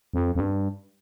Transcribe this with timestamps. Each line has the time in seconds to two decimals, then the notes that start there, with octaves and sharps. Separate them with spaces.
0.14 F2
0.35 F2
0.40 G2